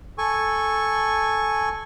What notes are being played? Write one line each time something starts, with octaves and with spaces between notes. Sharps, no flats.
A4 G#5 C#6